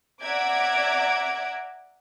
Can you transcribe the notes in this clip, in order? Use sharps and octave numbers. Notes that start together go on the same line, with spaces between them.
D5 E5 F#5 A#5 D6 G#6